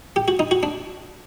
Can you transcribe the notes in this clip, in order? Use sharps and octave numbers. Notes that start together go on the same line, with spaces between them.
G4
F#4
D#4
F#4
D4